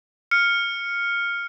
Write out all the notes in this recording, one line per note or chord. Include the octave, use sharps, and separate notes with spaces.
F6 C#7